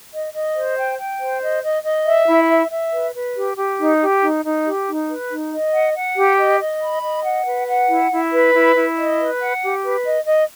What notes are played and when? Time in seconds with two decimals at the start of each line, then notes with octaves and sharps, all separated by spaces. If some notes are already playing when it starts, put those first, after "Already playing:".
0.12 D#5
0.33 D#5
0.55 C5
0.77 G5
0.99 G5
1.20 C5
1.41 D#5
1.63 D#5
1.85 D#5
2.06 E5
2.28 E4
2.50 E5
2.72 E5
2.92 B4
3.15 B4
3.36 G4
3.58 G4
3.79 D#4
4.01 G4
4.22 D#4
4.45 D#4
4.65 G4
4.87 D#4
5.09 B4
5.30 D#4
5.52 D#5
5.73 F#5
5.95 F#5
6.17 G4
6.38 D#5
6.59 D#5
6.82 B5
7.03 D#5
7.24 F#5
7.46 B4
7.68 F#5
7.90 E4
8.11 E4
8.33 B4
8.54 E4
8.76 E4
8.98 D#5
9.19 B4
9.41 F#5
9.63 G4
9.83 B4
10.06 D#5
10.27 D#5